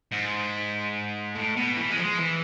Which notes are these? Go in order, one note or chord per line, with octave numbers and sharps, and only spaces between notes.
G#2
A2
B2
E3
G#3
F3
G#3
E3